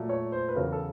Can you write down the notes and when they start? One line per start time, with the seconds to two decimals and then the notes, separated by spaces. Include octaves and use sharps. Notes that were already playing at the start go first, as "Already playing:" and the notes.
Already playing: A#2 F#3 A3
0.09 C#5
0.32 C5
0.49 B4
0.55 E2 C#3 F#3 A#4
0.72 A4